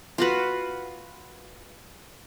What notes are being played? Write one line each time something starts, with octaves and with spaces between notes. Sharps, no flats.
F4 F#4 B4